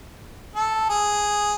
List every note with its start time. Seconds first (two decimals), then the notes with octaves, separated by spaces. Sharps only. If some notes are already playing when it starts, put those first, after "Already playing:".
0.56 A4
0.90 G#4